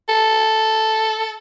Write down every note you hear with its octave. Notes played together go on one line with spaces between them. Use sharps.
A4